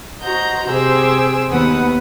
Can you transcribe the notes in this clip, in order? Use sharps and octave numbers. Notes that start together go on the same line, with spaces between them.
F#4 C5 D#5 A#5 G6
C3 G4 G#4 C5 E6
D#2 B3 B4 F#5 D#6